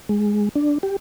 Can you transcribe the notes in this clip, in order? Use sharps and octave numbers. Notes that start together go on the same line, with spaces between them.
G#3
D4
G4